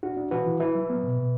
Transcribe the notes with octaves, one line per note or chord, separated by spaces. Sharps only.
D4 F#4
D4
E3 F#4 B4
E3
E4 B4 E5
F#3
B3
B2
B2